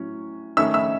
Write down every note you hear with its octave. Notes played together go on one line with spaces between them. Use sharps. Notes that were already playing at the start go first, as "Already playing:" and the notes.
Already playing: A2 F#3 C#4
D#3 A3 C#4 E5 E6
E5 E6